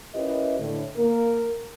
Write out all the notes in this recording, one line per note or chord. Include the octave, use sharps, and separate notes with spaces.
C#4 E4 G4 A#4 B4 D#5
A2 D3
A#3 A#4